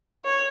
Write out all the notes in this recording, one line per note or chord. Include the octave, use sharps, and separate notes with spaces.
C#5